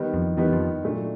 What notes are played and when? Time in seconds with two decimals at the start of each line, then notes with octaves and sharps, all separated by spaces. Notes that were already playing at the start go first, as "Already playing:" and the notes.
Already playing: D#3 G3 B3
0.14 F2 F3
0.37 E2 D#3 E3 G3 B3
0.52 F2 F3
0.84 A#2 F#3 A3 D4